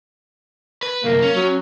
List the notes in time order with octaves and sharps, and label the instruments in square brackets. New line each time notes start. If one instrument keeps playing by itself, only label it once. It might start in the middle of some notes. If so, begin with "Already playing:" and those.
[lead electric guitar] B4
[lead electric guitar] C2 F#2 [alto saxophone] A#3
[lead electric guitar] C#4
[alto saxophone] F#3